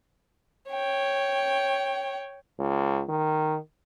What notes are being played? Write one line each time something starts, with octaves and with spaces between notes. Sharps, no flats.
C#5 G5
C#2
D#3